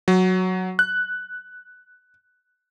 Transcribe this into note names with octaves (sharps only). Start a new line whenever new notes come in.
F#3
F#6